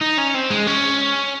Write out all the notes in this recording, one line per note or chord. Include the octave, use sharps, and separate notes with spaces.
D#4
C#4
C4
G#3
C#4